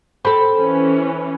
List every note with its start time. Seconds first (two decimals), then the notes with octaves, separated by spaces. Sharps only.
0.25 C4 A4 B5
0.56 E3 C#4